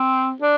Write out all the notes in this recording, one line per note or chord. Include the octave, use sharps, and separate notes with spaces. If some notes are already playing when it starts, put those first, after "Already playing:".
Already playing: C4
D4